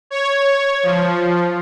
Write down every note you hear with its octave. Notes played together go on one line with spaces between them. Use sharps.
C#5
F3